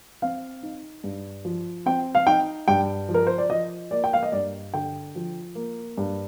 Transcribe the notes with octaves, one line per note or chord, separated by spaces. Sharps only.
C4 F5
D#4
G2
F3
C4 G5
F5
D#4 G5
G2 G5
F3
A#4
C5
D5
F3 D#5
A#3 D5
G5
F5
D#5
G2 D5
D3 G5
F3
A#3
G2